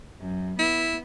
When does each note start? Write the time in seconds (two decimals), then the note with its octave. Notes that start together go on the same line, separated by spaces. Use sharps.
0.20 F#2
0.59 B3 E4